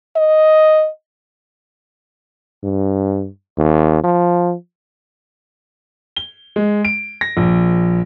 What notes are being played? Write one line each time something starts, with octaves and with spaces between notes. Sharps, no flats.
D#5
G2
D#2
F3
G7
G#3
D7
A#6
A#1